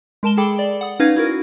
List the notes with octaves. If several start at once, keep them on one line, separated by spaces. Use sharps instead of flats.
G#3 A#4 A5 E7 G7
G#4 A4 G5 B5 D6
D5
F#5 D#6
C#4 D#4 B4 F5 G#6 A#6
E4 F#4 A#4